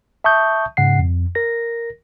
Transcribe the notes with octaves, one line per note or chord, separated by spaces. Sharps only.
E5 A5 C#6 D#6 G6
G#2 C#3 F#5 C7
F2
A#4 A#6